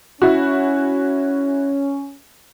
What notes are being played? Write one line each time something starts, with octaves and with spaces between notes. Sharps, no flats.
C#4 E4 F#4